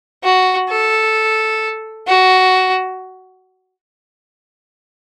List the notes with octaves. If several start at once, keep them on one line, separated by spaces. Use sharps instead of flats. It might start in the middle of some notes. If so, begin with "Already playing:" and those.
F#4
A4
F#4